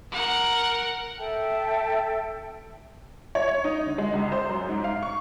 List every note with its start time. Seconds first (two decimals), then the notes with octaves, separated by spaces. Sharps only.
0.12 A#4 F#5
1.18 A4 E5 G5 A5
3.35 C#5
3.64 D#4
3.87 D3
3.98 G#3
4.13 C#2
4.32 C5
4.49 F#2
4.69 G#2
4.84 F5
5.03 C#6